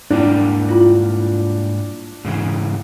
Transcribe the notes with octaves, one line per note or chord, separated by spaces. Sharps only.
G#2 G3 A#3 D4 E4
E4 F4 C6
G#2 C#3 E3